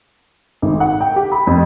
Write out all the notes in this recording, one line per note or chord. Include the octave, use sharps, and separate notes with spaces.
G#1
F#5
G5
G4
B5
F2